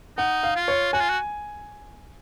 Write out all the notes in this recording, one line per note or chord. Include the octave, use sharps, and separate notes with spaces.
D#4 F#5
F5
F4
C#5
F#4 G#5
F4
F#4